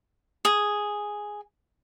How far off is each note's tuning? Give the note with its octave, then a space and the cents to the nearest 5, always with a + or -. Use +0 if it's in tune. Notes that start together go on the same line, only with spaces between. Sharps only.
G#4 +0